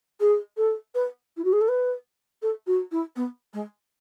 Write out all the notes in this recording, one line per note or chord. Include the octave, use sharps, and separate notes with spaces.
G#4
A4
B4
E4
F#4
G#4
A4
B4
A4
F#4
E4
B3
G#3